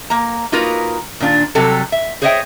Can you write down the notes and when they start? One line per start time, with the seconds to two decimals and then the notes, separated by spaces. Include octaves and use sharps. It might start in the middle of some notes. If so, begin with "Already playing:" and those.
0.10 A#3 A#5
0.52 A#3 D#4 F4 F#4 A#4 B4
1.20 A#2 D#3 D4 F4
1.55 C3 F#3 G3 G4 A4
1.92 E5
2.22 G#4 C5 C#5 D#5 E5 G5